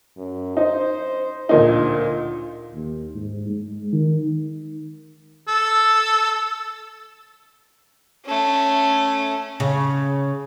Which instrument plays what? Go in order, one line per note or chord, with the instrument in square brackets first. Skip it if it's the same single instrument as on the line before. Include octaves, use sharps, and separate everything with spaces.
[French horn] F#2
[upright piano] D#4 [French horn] C5
[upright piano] D2 A#2 D#4 [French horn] F4
[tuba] D#2
G#2
G#3
D#3
[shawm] A4
[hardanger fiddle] A3 C#4
[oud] C#3